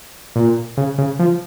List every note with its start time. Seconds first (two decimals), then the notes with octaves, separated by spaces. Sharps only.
0.36 A#2
0.77 C#3
0.98 C#3
1.19 F3